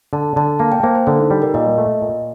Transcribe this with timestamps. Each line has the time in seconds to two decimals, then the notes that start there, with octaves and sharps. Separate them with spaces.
0.13 D3 A5
0.36 D3 A5
0.59 A#3 A5
0.72 G5
0.83 A#3 C5
0.95 C5
1.07 D3 A4
1.19 D#4
1.31 G3
1.42 A#4
1.54 A#2 D#5
1.78 A3
2.02 A#2